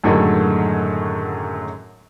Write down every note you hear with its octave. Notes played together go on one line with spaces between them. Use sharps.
F#2 A2 D3 D#3 F#3 G#3